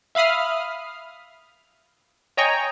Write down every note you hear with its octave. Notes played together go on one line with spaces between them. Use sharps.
E5 F5 B5 D#6 F6
C#5 D#5 G5 G#5 A#5 C#6